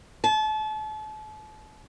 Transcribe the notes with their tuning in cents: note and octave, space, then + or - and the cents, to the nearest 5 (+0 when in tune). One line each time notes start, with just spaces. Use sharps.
A5 -35